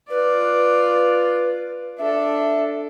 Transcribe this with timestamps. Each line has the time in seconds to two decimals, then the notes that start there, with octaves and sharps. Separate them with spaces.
0.10 F4 B4 D5
1.98 D4 A4 E5